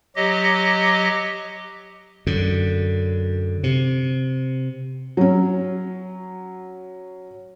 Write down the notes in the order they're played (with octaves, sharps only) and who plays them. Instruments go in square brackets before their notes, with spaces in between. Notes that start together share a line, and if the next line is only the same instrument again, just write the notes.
[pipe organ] F#3 G4 D#5
[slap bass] F#2 D3
C3
[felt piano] F#3 C#4